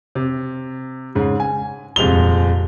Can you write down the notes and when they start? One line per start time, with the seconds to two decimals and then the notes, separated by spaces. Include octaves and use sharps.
0.15 C3
1.15 G#2 C#3
1.40 G#5
1.96 D#1 F2 C3 G#3 F7 G7